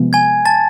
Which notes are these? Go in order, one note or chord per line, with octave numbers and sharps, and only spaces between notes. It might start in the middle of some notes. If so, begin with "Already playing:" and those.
Already playing: C3 F3 G#3 B3
G#5 G#6
A5 A6